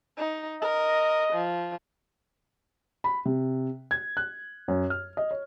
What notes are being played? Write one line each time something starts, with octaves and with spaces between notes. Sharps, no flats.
D#4
A#4 D#5
F3
B5
C3
G#6
F#6
F#2
F6
D#5
C#5